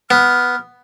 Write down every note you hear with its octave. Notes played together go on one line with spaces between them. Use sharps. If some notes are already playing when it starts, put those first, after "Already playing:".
B3 F6